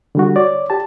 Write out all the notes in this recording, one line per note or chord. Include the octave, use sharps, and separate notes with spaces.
D3 G3 F#4
C#5 D5
G4 A5